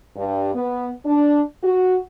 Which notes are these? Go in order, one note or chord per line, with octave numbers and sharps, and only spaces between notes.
G2
B3
D4
F#4